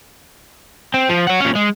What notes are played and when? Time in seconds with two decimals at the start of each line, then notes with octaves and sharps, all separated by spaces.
0.94 C4
1.09 F3
1.27 C#5 F#5
1.40 A#2 C#4
1.55 G#3